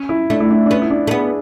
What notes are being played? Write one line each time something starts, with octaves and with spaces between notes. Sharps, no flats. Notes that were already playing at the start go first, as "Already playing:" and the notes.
Already playing: C#4
E4
A3 D4
E4
D4
D4
B3 C#4
E4
D4
A3
B3 G#4